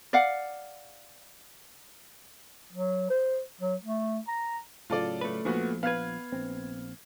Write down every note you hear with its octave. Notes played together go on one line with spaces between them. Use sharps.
D5 F5 F#5
F#3
C5
F#3
A3
A#5
A2 C#3 F#3 F4 A4 D5
A3 B4
A#1 A#2 F3 B3 F#4
B3 B4 F5 G#6
A#1 C4